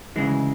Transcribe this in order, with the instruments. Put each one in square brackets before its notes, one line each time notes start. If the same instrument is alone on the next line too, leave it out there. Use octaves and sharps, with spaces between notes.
[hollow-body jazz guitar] D2 C#3 E3 G#3